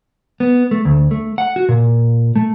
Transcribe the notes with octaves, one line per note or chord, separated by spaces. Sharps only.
B3
A3
D2
A3
F#5
F#4
A#2
A3